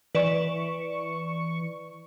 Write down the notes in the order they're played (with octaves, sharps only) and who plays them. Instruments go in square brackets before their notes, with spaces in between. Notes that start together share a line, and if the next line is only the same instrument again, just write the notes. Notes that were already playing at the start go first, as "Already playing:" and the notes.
[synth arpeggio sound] E3 C#6 [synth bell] B4 D5 E7